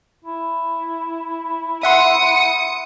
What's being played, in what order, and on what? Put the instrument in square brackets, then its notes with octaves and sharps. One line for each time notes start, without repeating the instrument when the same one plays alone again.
[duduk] E4
[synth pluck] E5 F#5 C6 [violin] D#6 C#7